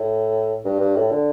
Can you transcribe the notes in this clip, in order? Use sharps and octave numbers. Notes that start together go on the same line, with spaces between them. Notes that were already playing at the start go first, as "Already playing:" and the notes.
Already playing: A2
G2
G2
A2
D3